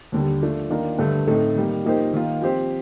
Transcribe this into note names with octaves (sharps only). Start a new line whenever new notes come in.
D#2 D3 G3
F3 A3 D4
D#3 A#3 D4 F4 A#4
G2 D3 A3
A2 A3 C4 D#4 A4
D#3 G3 A#3
F3 A#3 D#4 G4 C5
D#3 A#3 F4
F3 C4 G4 C5